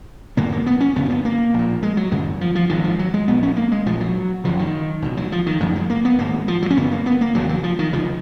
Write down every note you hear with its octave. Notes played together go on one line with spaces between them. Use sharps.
G#1 F#2 C#3 A#3
A#3
B3
C#4
F#1 F#2 C#3 B3
C#4
B3
A#3
A#1 A#2
G#3
F#3
G#1 F#2 C#3 G#3
F3
F3
G#1 G#2 D#3
F3
F#3
G#3
A#1 A#2 B3
C#4
A#3
G#3
A#1 A#2 F3
F#3
F#1 F#2 C#3 F3
D#3
C#2 B2
F#3
F3
D#3
F#1 F#2 C#3 F3
G#3
A#3
B3
G#1 G#2 A#3
F3
F#3
C#4
F#1 F#2 C#3 B3
A#3
B3
A#3
F1 D#2 C#3 F#3
F#3
F3
D#3
C#2 C#3 F3